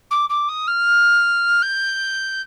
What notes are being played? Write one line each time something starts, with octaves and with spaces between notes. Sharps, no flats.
D6
D6
D#6
F6
G6